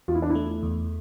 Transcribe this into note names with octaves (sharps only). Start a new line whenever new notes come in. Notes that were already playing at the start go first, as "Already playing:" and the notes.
E2 F4
E4
D4
E4
A3
E2